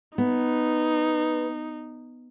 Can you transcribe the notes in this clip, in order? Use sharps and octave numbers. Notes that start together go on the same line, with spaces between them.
B3 D#4